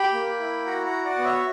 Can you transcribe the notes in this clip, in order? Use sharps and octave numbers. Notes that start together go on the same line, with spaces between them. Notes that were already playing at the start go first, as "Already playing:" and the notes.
Already playing: G4 G5 B5
A#3
E4
F#4 F#5 A#5
F#5 A#5
F#4
D5 F#5
B3
C#5 E5